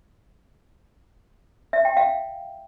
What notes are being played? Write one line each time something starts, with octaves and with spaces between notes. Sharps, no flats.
E5
G5
F5